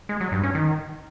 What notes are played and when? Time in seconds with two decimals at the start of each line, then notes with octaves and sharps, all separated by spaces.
0.09 G#3
0.21 F#3
0.32 G2
0.43 C#4
0.55 D#3